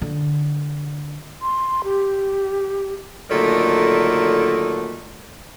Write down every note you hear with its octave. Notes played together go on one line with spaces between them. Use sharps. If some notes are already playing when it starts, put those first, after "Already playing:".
D3
C6
G4
A#2 D3 D#3 F#3 A3